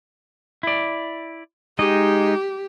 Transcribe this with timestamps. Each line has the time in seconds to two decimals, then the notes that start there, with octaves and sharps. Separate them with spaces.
0.63 E4 D5
1.79 G#3 D#4 G4 D#5